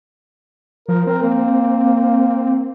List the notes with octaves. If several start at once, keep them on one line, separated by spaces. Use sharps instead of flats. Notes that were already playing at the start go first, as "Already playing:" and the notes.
F3 A#4
C4 A#4
A#3